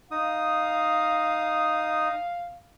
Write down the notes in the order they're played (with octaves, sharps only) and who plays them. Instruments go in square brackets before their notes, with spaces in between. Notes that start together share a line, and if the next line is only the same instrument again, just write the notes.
[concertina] D#4 D#6 [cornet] F5